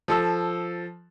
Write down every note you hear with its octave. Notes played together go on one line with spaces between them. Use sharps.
F3 A4 E6